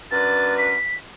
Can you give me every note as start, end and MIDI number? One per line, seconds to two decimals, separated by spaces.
0.11 0.74 42
0.11 0.74 62
0.11 0.74 71
0.11 0.57 93
0.58 0.95 95